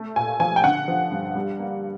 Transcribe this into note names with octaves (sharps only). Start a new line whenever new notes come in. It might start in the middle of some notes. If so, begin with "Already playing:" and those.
Already playing: A3
A#2 G#5
F3 G#5
G5
D3 F#5
F3
G2
G3
A#3